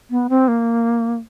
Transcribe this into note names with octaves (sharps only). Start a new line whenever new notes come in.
B3
C4
A#3